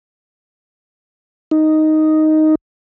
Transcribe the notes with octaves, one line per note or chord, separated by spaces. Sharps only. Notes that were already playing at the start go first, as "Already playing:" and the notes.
D#4